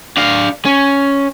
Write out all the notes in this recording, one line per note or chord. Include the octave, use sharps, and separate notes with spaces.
D4 F5
C#4